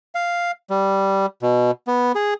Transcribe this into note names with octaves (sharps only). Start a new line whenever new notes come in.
F5
G3
B2
B3
G#4